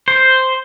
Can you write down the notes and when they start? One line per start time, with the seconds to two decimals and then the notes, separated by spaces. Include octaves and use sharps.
0.08 C5